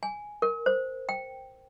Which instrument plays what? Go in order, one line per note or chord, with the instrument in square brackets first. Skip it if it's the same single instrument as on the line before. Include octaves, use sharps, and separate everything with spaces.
[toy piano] G#5
A#4
C5
G5